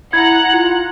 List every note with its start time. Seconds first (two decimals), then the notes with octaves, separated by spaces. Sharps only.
0.13 E4 F#5 A#5 F#6 G#6
0.53 F4